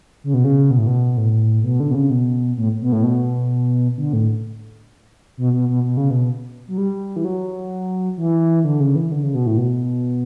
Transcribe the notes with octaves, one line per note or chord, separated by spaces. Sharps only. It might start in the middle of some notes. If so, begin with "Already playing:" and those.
C#3
B2
C#3
B2
A2
B2
A2
B2
D3
B2
C#3
B2
A2
B2
A2
B2
D3
A2
B2
B2
B2
B2
C#3
B2
F#3
G3
E3
F#3
E3
D3
C#3
E3
D3
C#3
B2
A2
B2